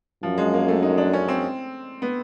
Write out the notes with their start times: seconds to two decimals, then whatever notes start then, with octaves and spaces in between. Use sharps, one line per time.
0.23 F#2 F3
0.38 G#3
0.53 A#3
0.68 A3
0.83 D#4
0.98 D4
1.13 C#4
1.28 C4
2.02 B3